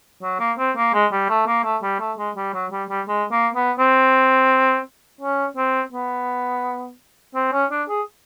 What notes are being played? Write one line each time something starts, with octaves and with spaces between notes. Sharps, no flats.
F#3
A#3
C4
A#3
G#3
G3
A3
A#3
A3
G3
A3
G#3
G3
F#3
G3
G3
G#3
A#3
B3
C4
C#4
C4
B3
C4
C#4
D4
G#4